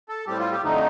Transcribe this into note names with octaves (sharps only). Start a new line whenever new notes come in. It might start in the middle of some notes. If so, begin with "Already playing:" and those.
A4
A2 G3 C4 G4
F4
G4
F2 D3 A3 D#4